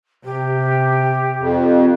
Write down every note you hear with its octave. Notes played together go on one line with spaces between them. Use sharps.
C3 G4
F2